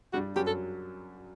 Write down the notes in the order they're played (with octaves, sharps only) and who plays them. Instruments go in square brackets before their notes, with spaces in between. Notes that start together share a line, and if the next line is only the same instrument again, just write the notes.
[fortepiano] G2 G3 [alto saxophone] F#4
[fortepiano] F#2 F#3 [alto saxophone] G4
[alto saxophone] A4